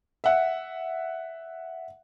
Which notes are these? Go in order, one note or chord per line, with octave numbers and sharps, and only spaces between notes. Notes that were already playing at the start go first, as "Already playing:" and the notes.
E5 F#5